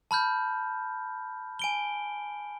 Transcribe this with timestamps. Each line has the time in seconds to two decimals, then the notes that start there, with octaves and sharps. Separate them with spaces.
0.11 A5 B5 F6 G6
1.59 G#5 D7 G7